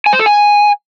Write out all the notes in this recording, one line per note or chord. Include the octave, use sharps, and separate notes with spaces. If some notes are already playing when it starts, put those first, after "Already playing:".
G#5
C5
A4
G#5